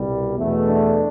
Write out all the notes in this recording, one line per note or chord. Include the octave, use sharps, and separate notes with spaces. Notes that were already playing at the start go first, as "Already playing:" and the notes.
Already playing: C2 B2 G3
E2 B2 A3
D4